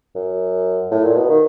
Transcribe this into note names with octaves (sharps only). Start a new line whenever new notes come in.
F#2
A2
A#2
B2
D#3